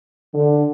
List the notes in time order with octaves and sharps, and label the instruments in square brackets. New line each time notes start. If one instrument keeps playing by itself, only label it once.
[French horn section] D3